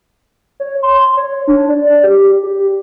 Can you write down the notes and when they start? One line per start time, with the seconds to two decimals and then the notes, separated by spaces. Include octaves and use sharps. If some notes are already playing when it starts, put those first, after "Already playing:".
0.60 C#5
0.83 C6
1.17 C#5
1.48 D4
1.69 D5
2.04 G4
2.44 G4